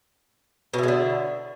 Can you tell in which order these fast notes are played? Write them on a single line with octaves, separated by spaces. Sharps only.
B2 E4 G#3 D3